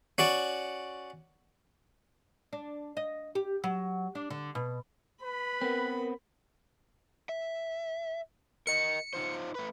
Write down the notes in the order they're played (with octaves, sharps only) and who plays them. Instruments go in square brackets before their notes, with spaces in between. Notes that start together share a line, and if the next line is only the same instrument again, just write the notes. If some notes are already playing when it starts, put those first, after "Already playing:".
[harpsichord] C#4 F#4 D5
[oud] D4
D#5
G4
F#3
D4
D3
B2
[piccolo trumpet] B4 [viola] B5
[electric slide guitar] B3 C4 [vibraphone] A#4
[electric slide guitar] E5
[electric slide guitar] A#4 D#5 [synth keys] C#7
[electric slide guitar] D#4 F4 C5
A3 B4